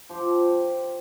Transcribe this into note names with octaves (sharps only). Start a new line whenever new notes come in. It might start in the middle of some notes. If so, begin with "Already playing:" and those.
F3 G4